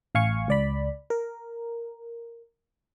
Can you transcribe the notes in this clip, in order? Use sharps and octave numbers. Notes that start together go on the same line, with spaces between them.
A1 F5 G#5 C#6
C#2 D5 B5
A#4